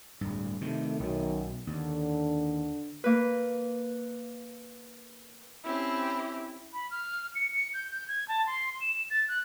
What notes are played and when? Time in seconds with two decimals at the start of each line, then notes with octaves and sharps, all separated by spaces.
0.21 D1 G2
0.61 C3 D#3 A3
1.00 B1 F#2 B2 D#3
1.67 D#2 D3
3.04 A#3 B4
5.64 C4 C#4 E4 G4
6.73 B5
6.91 F6
7.35 C#7
7.54 C#7
7.74 G6
7.91 G6
8.08 G#6
8.28 A5
8.47 C6
8.81 E7
9.10 A6
9.28 F#6